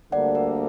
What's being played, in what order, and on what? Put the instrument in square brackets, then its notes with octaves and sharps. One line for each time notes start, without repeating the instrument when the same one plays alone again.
[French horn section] D2 D3 G3 A#3 [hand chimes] D5 F#5
[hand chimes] A#4